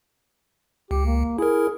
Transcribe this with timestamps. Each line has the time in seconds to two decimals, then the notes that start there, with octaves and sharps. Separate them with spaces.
0.91 C#2 G4
1.06 A#3
1.38 E4 G#4 A#4